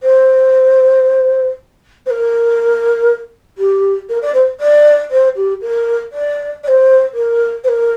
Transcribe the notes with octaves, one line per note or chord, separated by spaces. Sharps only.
C5
C5
A#4
G4
A#4
D5
C5
D5
C5
G4
A#4
D5
D5
C5
A#4
C5
A#4